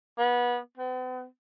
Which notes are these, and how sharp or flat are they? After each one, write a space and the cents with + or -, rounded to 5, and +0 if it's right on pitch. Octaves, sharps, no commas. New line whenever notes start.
B3 -25
B3 +45